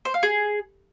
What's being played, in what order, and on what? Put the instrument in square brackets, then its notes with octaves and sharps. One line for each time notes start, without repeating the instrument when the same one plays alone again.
[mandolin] C5
F5
G#4